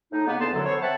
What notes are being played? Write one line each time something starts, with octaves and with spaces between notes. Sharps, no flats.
A2 D#4
C#3 G#3 A#3 B3
E2 D3 B3 A5 C6
F#2 A2 D3 F#3
B3 A4 C5 C#5
C4 C5 E5 F#5 A5